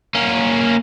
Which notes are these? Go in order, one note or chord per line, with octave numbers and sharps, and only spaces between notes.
A#3 C#4